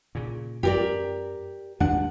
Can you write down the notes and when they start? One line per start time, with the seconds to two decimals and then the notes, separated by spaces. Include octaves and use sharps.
0.15 A#2 C#3
0.63 F#2 G4 A#4 D5
1.80 D#2 G#3 D4 F#5